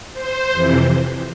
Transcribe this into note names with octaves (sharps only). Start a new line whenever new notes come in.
C5
F2 C3 E3